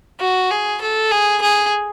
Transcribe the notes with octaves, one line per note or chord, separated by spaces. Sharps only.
F#4
G#4
A4
G#4
G#4